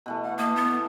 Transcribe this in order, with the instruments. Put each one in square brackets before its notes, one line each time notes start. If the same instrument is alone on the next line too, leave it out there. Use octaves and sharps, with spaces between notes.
[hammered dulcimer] B2 E3 A3
[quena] F#5
[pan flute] A#3 [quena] D#6
[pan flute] B3 [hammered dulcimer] E4